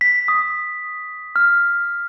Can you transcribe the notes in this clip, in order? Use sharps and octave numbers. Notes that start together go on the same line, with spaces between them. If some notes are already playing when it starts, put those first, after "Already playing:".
B6
D#6
F6